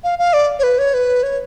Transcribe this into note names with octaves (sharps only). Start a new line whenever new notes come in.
F5
F5
D5
C#5
B4
C#5
B4
C#5